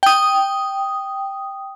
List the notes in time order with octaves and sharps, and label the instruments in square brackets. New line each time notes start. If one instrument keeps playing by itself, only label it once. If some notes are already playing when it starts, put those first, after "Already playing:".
[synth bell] G5 D#6